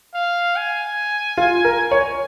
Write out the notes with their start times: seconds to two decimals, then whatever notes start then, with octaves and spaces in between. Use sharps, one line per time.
0.14 F5
0.56 G#5
1.37 F4
1.64 A#4
1.91 C#5